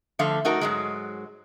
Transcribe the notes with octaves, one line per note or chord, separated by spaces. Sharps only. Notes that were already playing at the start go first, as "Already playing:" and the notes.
D3 F3 A3 F5
A3 D#4 F#4 A#4
G#2 F#3 G#3